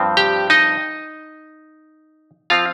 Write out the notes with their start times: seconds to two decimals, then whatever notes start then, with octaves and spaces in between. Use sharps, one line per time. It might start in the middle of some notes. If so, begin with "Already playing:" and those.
Already playing: G2 F3 C4
0.17 G4 G5
0.50 D#4 D#5
2.50 F3 C4 F4 F5